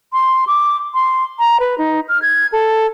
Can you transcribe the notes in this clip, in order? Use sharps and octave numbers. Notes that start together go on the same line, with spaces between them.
C6
D6
C6
A#5
B4
D#4
F6
G#6
A4